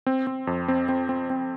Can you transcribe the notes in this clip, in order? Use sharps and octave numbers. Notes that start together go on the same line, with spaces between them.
C4
C4
F2
C4
C4
C4
C4